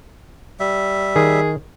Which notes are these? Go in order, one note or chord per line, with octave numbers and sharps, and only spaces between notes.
G3 E5
D#3 G#4